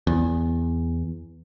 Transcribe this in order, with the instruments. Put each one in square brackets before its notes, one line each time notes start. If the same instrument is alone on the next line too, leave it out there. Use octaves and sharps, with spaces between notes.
[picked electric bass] E2